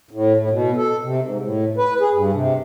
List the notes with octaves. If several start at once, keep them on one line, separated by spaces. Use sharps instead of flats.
A2
A2
B2
A4
C3
G#2
A2
B4
G#4
G2
C3